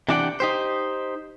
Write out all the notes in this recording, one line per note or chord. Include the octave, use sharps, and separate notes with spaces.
C3 E3 D4 D5 F#5 G5
D#4 G4 C5